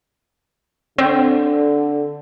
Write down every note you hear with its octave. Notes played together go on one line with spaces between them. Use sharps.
D3 C4